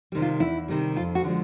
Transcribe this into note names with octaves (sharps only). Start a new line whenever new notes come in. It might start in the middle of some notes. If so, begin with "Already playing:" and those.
C3 D#3 G3
F4
E2 E4
C3 D#3 G3
F2 F4
F#4
D3 F3 G#3